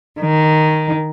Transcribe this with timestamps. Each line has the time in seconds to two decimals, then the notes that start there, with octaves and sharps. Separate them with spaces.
0.20 D#3